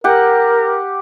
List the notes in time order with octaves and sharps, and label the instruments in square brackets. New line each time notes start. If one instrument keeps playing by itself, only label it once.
[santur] G4 F#5 [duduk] A#4